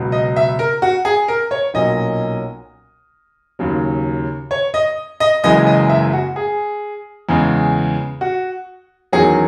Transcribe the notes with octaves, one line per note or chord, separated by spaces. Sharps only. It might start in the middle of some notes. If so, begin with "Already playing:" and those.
Already playing: C#2 B2 F#3
D#5
E5
A#4
F#4
G#4
A#4
C#5
B1 A#2 F#3 C#4 D#5
D#2 C#3 F#3
C#5
D#5
D#5
F#1 F#2 C#3 E3 G#3 D#5
D#5
E5
F#4
G#4
E2 C#3 G#3
F#4
E2 D#3 F#3 C#4 G#4